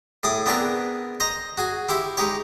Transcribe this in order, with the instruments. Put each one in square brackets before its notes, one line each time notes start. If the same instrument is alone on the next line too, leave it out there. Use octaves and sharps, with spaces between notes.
[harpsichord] A2 G#4 D6 D#6
B3 C4 D4 G#4 A#4 B4
C5 D#5 A#5
F#4 G#4 G#5
E4 G4 C5 E5
G#3 D#4 G4 C#5